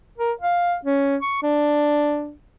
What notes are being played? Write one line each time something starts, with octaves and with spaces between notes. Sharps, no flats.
A#4
F5
C#4
C#6
D4